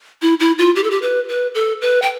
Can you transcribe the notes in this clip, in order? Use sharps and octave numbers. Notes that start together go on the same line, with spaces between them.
E4
E4
F4
G4
A4
G4
B4
B4
A4
B4
G5